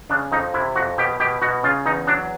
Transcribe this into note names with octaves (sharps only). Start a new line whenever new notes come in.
C#3 D4
F2 D#4
C3 E4
F2 F#4
B2 G4
B2 G4
B2 F#4
C#3 F4
E2 D#4
F#3 D4